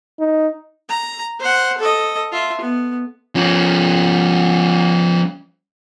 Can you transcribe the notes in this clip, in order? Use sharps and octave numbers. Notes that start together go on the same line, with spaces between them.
D#4
A#5
C5 F#5
A4 D#5
F4 E5
B3
F3 C#4